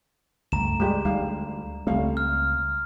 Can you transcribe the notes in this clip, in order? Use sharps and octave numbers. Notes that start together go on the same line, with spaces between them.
C#2 G2 A3 A#5 E7
G3 G#3 G4
D2 G3 D#4 F5
C#2 G3 A3 C4 F5
F6